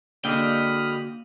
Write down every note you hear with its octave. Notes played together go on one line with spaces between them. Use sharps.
D3 G#3 A#3 F#4 G5 B5 D#6 F6